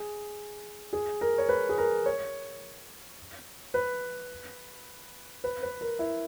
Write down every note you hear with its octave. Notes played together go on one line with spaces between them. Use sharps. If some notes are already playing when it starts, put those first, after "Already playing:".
Already playing: G#4
G#4
A#4
C#5
B4
G#4
A#4
C#5
B4
B4
B4
A#4
E4